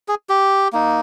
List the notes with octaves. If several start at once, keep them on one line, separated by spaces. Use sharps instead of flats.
G#4
G4
A#3 D#4